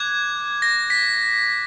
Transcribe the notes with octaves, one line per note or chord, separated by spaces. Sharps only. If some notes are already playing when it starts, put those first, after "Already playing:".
Already playing: D6 F#6 G#6
A#6
B6